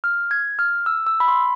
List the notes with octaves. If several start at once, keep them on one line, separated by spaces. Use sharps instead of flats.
F6
G#6
F6
E6
E6
B5
C6